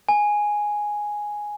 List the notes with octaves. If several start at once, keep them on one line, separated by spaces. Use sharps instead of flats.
G#5